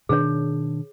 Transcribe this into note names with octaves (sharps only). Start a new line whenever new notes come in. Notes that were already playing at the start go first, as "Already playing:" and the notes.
B2 D#3 D4 G#4 C#5